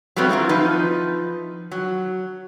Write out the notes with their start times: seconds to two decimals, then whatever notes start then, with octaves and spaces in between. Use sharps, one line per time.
0.16 F#3 G3 A3 B3 C4
0.29 F#3 C4 E4 F4
0.49 F3 D#4 B4
1.71 F#3